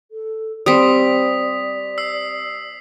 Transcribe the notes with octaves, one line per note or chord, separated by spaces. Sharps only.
A4
G3 C4 D5 D#6 B6
E6 C7